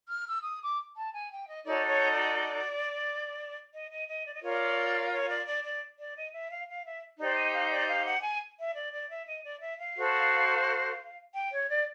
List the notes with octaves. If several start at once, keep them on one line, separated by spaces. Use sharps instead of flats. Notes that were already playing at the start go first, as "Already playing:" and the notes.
F6
E6
D#6
D6
A5
G#5
G5
D#5
D#4 F#4 A4 C#5 D5
C#5
D5
D#5
D#5
D#5
D5
D#5
F4 A#4 C#5 D5
C#5
D5
D5
D5
D5
D#5
E5
F5
F5
E5
D#4 G4 C5 D5
D#5
F5
D5
F5
F#5
G#5
E5
D5
D5
E5
D#5
D5
E5
F5
F#4 A4 C5
G5
C#5
D5